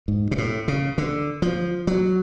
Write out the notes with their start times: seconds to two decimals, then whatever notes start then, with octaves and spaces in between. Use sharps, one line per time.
0.08 G#2
0.31 B2
0.38 A2
0.68 C#3
0.98 D3
1.42 F3
1.87 F#3